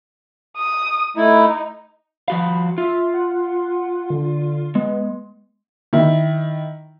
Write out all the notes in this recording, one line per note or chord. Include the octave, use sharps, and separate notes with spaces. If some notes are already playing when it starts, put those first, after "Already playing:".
D#6
A3 D#4 E4
F3 F#4 F5 B5
F4 E5
F#5
D3
G#3 B3
D#3 E4